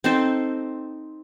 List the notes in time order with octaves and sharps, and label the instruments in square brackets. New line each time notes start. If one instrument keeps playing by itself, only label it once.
[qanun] C4 D#4 A4 C5